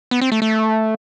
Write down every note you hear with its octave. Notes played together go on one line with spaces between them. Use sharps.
B3
C4
A3
A3